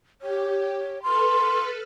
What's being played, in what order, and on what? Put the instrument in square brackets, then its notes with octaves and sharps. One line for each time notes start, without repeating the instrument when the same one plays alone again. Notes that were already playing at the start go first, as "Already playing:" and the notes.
[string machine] G4 [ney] C#5
[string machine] A4 B4 F6 [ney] C6